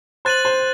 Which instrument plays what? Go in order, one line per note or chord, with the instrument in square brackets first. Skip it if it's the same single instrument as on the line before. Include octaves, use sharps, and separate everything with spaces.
[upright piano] C5 [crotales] F#6 A6 D#7 F#7
[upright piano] C5